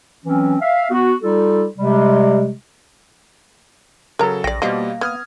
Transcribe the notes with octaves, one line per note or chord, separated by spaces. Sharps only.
E3 F#3 C4 C#4
E5 F5
B3 F#4
G3 D#4 F4 A4
C3 G3 G#3
C#3 F#3 A4 A#4 A#5
A#1 D5 G5 A#6
B2 F3 G3 A#3 D#5
B3 D#6 F6 G#6